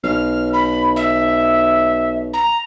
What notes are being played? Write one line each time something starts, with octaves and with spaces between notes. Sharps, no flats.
B1 F6
B5
E5
A#5